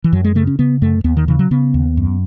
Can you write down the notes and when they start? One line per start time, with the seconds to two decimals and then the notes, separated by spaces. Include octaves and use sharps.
0.04 E3
0.13 F#2 F#3
0.24 G#3
0.35 C#3 A3
0.47 C#4
0.59 C#3 B3
0.82 F#2 A3
1.04 D#2 B3
1.17 D#3
1.28 C#3 E3
1.39 F#3
1.51 C#3 B3
1.74 D#2
1.97 F#2